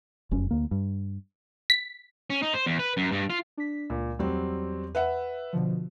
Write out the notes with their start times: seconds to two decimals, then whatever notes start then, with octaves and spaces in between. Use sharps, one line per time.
0.31 F1 F#2 C#4
0.51 D2 A#3
0.71 G2
1.70 B6
2.30 C#4
2.42 D#4
2.54 C5
2.66 E2
2.79 B4
2.97 F#2
3.12 G2
3.30 F4
3.58 D4 B6
3.90 C#2 A#2
4.19 E2 F#3 G3 C4
4.95 B4 E5 F#5
5.53 B2 D3 F3